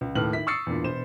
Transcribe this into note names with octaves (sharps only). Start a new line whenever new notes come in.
C#2
D#2 A2 A4 B4 F6 F#7
D#3 E4 B6
C#6 D#6 E6 A6 C7 C#7
E2 G2 A#2
E1 B3 C5 E7